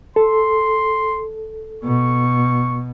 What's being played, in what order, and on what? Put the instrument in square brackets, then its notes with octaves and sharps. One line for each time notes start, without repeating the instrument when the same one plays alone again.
[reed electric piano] A4 [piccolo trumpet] C6
[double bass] B2 [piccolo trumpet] C#6